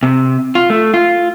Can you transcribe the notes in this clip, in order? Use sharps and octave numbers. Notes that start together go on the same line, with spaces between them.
C3
F4
A3
F4